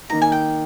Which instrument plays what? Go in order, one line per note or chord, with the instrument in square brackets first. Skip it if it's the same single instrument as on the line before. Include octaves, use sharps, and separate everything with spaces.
[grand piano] D#3 A#3 D#4 [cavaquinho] A#5
[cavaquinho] G#5
G5